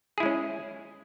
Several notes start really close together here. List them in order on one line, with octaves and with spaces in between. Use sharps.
G#4 E4 G#3 C#4